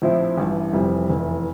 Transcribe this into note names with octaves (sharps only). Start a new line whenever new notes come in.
A#1 A2 F3 C4 E4
A1 G2 E3
F1 F2 C3 E3 G3
F1 E2 E3